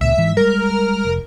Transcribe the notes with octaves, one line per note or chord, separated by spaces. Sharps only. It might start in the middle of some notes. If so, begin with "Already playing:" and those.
C#2 A#2 E5
G#2 E3
G3 G#3 A#4
F1